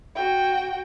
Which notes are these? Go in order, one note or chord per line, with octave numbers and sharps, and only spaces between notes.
F#4 G5